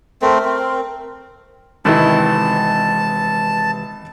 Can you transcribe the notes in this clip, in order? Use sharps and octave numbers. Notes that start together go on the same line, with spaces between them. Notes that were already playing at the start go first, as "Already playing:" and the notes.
A3 C4 A#4
C4
G#1 C3 D#3 E3 G#3 E4 A5